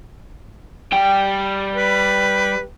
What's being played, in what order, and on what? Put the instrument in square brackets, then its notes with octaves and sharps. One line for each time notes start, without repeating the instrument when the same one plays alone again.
[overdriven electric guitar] G3 G5
[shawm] B4